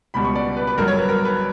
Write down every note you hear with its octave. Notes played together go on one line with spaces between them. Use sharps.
C#2 B2 G3 B5
C#6
D5
B4
B4
G1 G2 F#3 A#4
C#5
B4
A#4
B4